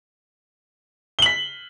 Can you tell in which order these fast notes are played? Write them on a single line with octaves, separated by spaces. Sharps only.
G7 F#7 B6